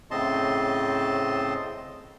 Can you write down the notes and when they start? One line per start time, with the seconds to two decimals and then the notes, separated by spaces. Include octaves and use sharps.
0.11 A2 C#3 C4 D#5 A5 C6